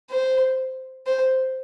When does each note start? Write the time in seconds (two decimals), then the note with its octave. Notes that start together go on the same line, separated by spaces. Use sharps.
0.10 C5
1.06 C5